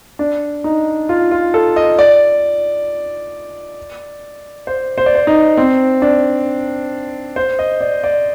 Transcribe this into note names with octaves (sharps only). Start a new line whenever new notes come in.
D4
D#4
F4
F4
A4
D#5
D5
C5
C5
D5
C5
D#4
C4
D4
C5
D#5
D5
D5